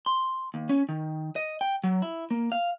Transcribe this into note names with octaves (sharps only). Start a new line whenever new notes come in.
C6
D#2
C#4
D#3
D#5
G5
F#3
E4
A#3
F5